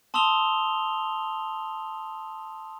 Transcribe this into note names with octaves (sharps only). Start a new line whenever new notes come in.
A5 C6 D#6 E6 F7 G7